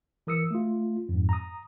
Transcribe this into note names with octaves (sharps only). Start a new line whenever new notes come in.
E3 A#4 D#6 E6 C#7
A3 F4
F2 G#2
A#5 D#6